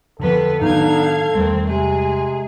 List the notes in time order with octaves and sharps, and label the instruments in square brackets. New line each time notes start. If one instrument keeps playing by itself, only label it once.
[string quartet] F2 B3 B4 [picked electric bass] D3 F3 [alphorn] A4
[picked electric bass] A2 D#3 F#3 [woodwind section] B3 D4 D#4 [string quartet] F5 G#6
[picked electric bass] E2 G3 A3 [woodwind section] D#3 [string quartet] C4
[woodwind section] C3 G#3 [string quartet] G#4